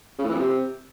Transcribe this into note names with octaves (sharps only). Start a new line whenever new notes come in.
C#3
A2
E3
F2
C3